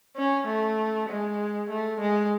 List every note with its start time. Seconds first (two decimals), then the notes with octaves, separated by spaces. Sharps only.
0.16 C#4
0.48 A3
1.09 G#3
1.70 A3
2.01 G#3